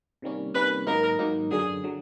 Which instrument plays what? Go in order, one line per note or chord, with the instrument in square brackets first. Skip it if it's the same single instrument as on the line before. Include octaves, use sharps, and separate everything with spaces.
[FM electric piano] C3 D#3 G3 A#3 C#4
[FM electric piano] C3 D#3 G3 A#3 C#4 [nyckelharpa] B4
[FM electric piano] G#2 D#3 F#3 A#3 D#4 [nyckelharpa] A#4
[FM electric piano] G#2 D#3 F#3 A#3 D#4
[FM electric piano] F#2 D3 F#3 [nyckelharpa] G#4
[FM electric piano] D3 F#3